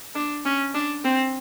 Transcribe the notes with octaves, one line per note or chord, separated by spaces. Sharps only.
D4
C#4
D4
C4